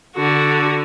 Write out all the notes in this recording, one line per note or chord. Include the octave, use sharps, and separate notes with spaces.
D3 F#4